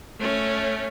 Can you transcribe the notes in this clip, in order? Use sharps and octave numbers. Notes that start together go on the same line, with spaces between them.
A3 C#4